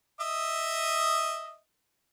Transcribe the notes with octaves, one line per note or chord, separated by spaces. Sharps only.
D#5 E5 D#6